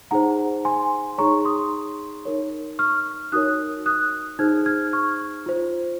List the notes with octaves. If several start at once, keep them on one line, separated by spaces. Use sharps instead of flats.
D#4 G#4 C5 F#5 A#5
G#5 C6
D#4 G#4 C#5 A#5 C#6
C6 D#6
D#4 A#4 C#5
C#6 F6
D#4 F#4 A#4 C#5 D#6 F#6
D#6 F#6
D#4 G#4 C5 F6 G#6
F6 G#6
C#6 F6
F4 C5